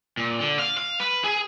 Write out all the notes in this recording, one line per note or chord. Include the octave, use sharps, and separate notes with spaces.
A#2
D3
F5
F5
B4
G#4